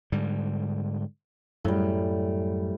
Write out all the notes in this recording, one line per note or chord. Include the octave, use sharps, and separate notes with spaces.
G#2 D3 G3
F#2 A2 G3